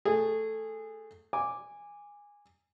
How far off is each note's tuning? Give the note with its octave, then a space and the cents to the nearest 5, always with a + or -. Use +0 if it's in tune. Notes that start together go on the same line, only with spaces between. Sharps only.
A3 +0 G#4 -15
G#5 -15 D6 +0